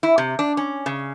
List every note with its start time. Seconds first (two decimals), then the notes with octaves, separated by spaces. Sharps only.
0.03 E4
0.18 C3
0.39 D4
0.57 C#4
0.86 C#3